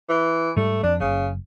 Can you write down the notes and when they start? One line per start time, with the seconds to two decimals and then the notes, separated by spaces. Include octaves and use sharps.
0.09 E3
0.57 G#2 G3 A3
0.83 F2 D4
1.00 F#1 C#3